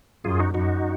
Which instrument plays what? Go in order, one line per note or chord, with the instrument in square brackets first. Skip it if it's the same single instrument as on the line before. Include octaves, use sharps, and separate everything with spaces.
[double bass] F#2 [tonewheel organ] F4 G#4
[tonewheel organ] D#4 F#4
[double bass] F#2 [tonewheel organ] D#4 F#4